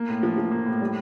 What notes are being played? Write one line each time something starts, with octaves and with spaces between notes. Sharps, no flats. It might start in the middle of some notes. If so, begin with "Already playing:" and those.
Already playing: A#3
A2
F3
F3
A#3
A2
G3